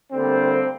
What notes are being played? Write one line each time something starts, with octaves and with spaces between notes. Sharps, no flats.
D2 D3 G3 A#3 C4